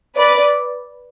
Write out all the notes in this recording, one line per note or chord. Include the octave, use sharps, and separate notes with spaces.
B4 D5